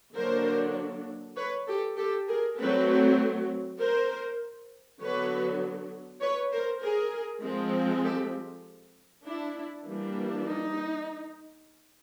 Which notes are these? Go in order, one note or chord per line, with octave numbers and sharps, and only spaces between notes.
D3 F#3 A#3 D4 A#4 C5
B4 C#5
G4 A4
G4 A4
G#4 A#4
F#3 A3 C4 A4 B4
A#4 C5
D3 F#3 B3 B4 C#5
B4 C#5
A#4 C5
G#4 A#4
F3 G#3 C4
G4 A4
D4 E4
E3 G3 A#3 D4
D#4